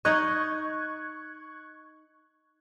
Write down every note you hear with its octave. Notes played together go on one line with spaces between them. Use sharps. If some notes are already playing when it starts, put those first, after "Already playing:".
D#4 D#5 C#6 F#6 G#6